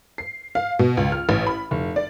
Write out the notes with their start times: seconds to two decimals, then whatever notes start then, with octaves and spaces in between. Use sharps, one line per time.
0.18 C7
0.55 F5
0.79 B2
0.97 C#2
1.12 F6
1.29 A1
1.47 B5
1.71 F1
1.96 D5